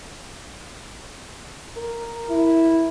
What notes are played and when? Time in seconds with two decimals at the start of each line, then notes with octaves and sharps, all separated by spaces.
1.77 A#4
2.29 E4